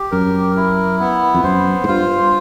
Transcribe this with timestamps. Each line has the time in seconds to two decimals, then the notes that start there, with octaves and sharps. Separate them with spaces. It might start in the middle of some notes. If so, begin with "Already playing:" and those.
Already playing: G4
0.11 F#2 A#4
0.57 E4
1.00 B3
1.34 F2
1.44 F#2 C5
1.84 G#2
1.88 G2 F4